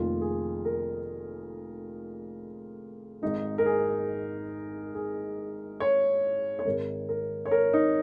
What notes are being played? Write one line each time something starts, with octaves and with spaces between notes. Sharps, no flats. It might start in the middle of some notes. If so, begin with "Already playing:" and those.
Already playing: F1 F2 D#3 A#3 F4
G#4
A#4
G#1 G#2 G#3 D#4
A#4
G#4
G#4
C#5
C#5
G#1 G#2 D#3 G#3 A#4
A#4
C#5
A#4
D#4